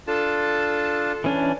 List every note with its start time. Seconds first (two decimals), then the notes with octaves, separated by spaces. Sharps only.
0.07 D4 F4 A4 A5
1.24 E3 C#4 D4